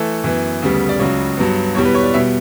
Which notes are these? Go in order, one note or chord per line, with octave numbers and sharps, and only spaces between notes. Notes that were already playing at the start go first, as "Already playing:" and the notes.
Already playing: E3 A3 A4
F#2 E3 B3
D2 C#3 G3 B3
D5
C#2 C#3 F#3 C#5
G2 F#3 B3
E2 B2 G3 C#5
B4
C#5
D5
B2 G3 B3 E5